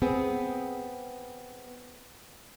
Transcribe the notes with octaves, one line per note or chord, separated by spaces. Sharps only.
B3 C4 G#4